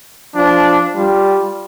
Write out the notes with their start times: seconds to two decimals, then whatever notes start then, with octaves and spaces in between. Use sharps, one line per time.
0.35 F3 D4
0.96 G3 F4